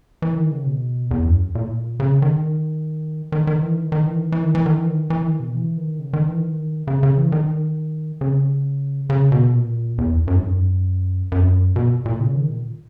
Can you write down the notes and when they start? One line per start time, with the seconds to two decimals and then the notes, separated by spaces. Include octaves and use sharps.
0.22 E3
0.37 D#3
0.51 C#3
0.66 B2
1.11 E2
1.25 F#2
1.55 A#2
2.00 C#3
2.22 D#3
3.32 D#3
3.47 D#3
3.62 E3
3.77 D#3
3.92 D#3
4.07 E3
4.22 D#3
4.32 E3
4.43 D#3
4.55 E3
4.66 D#3
4.77 E3
4.88 D#3
5.10 E3
5.24 D#3
5.40 B2
5.54 E3
5.77 D#3
5.99 C#3
6.13 D#3
6.29 E3
6.43 D#3
6.87 C#3
7.03 C#3
7.17 E3
7.32 D#3
8.21 C#3
9.10 C#3
9.32 B2
9.54 A#2
9.98 E2
10.27 F#2
10.36 G#2
10.43 F#2
11.32 F#2
11.76 B2
12.06 A#2
12.20 C#3
12.35 D#3
12.50 A#2